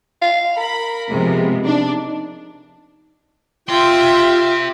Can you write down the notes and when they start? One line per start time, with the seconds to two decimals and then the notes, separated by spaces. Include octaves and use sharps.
0.22 F5
0.57 A#4 B5
1.09 C3 F3 G#3 B3
1.65 D4 D#4
3.69 F4 G4 E5 G5 C6